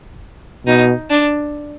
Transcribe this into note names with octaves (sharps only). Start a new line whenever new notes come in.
B2 D#4
D4